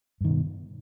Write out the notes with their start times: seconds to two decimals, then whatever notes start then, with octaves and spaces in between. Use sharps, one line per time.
0.21 G2
0.25 D#3
0.28 B2